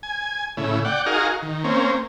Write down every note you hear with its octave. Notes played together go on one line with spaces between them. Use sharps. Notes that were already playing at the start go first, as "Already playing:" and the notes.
G#5
A2 C#3 E4
D5 F#5 G5
D#4 F#4 G#4 A#4 F5
D#3
A#3 C4 C#4